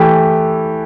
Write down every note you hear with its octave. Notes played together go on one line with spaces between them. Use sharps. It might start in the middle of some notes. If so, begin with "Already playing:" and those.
Already playing: E3 A3 E4 G4